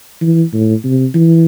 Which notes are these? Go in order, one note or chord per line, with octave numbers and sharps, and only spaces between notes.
E3
A2
C3
E3